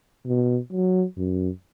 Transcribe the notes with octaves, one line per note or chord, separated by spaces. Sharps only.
B2
F#3
F#2